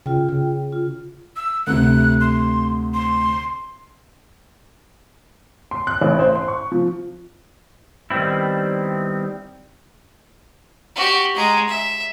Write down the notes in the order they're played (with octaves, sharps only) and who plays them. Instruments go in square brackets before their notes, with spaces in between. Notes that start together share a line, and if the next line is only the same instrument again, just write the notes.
[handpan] C#3 [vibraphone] F4 G5
[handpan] C#3
[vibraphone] F4
[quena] E6
[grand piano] D2 C3 [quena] F#6
[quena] C6
C6
[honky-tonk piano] C6
F#6
A1
C5
C6
C#6
F3
[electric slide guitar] D#3 G3 B3 C4 E4
[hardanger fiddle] F#4 G4
G#3 A#5
E5